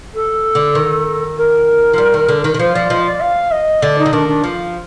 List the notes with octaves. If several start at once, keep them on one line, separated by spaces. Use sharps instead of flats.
A4
D3
D#3
A#4
F3
G3
D#3
D3
D#3
D#3
F3 C5
F3 D5
F3 D#5
D5
F5
D#5
D3 D5
D#4
D3
D#3 D4
D4
F3